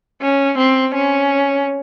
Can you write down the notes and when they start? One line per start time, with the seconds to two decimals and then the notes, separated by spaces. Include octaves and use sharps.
0.21 C#4
0.58 C4
0.94 C#4